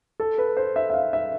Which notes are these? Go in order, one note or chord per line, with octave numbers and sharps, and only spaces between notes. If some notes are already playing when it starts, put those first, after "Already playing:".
A4
B4
C5
E5
E5
F5
E5